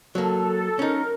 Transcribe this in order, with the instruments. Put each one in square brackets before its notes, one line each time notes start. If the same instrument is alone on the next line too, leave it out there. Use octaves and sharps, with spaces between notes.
[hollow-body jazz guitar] F#3 A#3 [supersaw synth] A4
[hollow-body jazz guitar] C#4 D#4 [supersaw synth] A#4